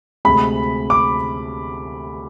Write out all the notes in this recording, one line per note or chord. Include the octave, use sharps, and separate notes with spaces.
D2 C3 G#3 B5
D6